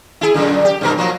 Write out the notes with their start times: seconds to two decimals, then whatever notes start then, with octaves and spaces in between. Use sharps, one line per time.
0.21 E4 G#4
0.34 F#2 A#2 D3
0.65 G4
0.81 G2 B2 A#4
0.98 F3 F#3 A#3